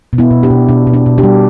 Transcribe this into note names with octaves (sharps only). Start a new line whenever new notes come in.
B2
B3 E4
B2
D4 G4
B2
B2 D4
B2
D4
B2
D4 G4
G3